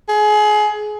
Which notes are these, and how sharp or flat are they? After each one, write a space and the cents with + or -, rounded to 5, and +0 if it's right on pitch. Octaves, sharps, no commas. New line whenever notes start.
G#4 +25